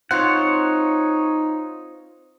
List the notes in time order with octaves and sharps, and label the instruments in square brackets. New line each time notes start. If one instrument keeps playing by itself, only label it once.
[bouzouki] C4 F4 C5 [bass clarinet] D#4 [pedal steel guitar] C#5 F#5